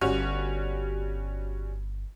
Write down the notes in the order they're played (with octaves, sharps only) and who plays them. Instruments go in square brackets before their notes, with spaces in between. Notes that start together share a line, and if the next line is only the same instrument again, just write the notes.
[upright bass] G1 [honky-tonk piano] G3 C#4 F#4